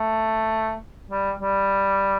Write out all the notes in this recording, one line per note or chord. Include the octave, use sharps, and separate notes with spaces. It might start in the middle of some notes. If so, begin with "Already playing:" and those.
Already playing: A3
G3
G3